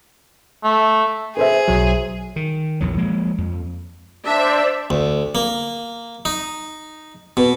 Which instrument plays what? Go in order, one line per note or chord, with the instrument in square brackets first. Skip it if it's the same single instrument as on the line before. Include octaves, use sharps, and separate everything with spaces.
[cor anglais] A3
[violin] G#4 [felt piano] B4 C5 E5
[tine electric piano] B1 F#3
[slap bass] D#3
A#1 E2 F#3
F3 G#3 A#3
F2
[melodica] D4 [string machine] C5 D5 [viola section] E5
[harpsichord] D2
A#3
D#4
B2